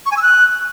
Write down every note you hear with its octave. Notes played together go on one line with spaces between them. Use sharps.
C#6
G#5
E6
F#6